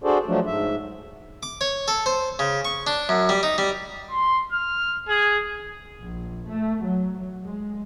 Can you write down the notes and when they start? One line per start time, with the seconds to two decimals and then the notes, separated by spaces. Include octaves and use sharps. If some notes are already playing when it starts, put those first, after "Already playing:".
0.04 D4 F#4 G#4 A4 C5 D5
0.26 F3 F#3 A3 D4
0.46 G#2 E5
1.43 D6
1.61 C#5
1.88 A4
2.06 C5
2.39 C#3
2.65 C#6
2.87 D4
3.09 F#2
3.29 G3
3.43 D#4
3.58 G3
4.11 C6
4.52 F6
5.09 G#4
6.03 A#1
6.49 A3
6.84 F#3
7.46 G#3